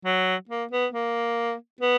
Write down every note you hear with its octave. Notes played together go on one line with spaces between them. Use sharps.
F#3
A#3
B3
A#3
B3